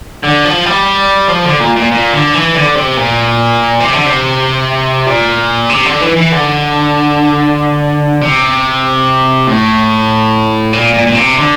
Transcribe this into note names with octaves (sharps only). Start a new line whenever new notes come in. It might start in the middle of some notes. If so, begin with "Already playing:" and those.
D3
F3
G3
F3
D3
A#2
A#2
A#2
D3
E3
D3
C3
A#2
C3
D3
C3
A#2
C3
D3
E3
E3
D3
C3
A2
A#2
A#2
A#2
C3
D3